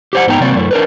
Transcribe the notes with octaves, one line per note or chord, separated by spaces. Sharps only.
G4 C5 F#5
G#2 B3 D#4 G5 A5 A#5
C3 F#3 A#3 C4 D5
F#2 A3
D4 A#4 B4